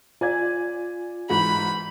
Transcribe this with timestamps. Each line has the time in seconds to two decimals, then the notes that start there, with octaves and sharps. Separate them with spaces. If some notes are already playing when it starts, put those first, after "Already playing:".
0.21 F4 D5 G#5 G#6
1.30 G#2 E3 F#4 B5